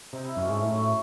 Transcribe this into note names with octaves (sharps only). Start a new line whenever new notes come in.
C3 D#4
E4
F#2 C#4
G#3
G#2 A3
A2 F#3
A3